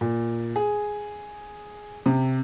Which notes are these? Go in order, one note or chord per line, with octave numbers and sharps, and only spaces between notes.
A#2
G#4
C3